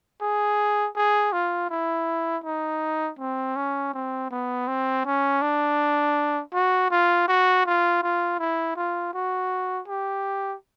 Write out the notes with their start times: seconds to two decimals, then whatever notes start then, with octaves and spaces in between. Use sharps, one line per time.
0.21 G#4
0.96 G#4
1.32 F4
1.70 E4
2.44 D#4
3.19 C4
3.56 C#4
3.93 C4
4.31 B3
4.68 C4
5.05 C#4
5.41 D4
6.53 F#4
6.91 F4
7.28 F#4
7.66 F4
8.02 F4
8.39 E4
8.76 F4
9.14 F#4
9.88 G4